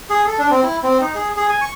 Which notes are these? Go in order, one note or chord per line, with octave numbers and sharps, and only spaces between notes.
G#4
A4
D4
C4
E4
C4
D#4
G#4
G#4
G#5
C#6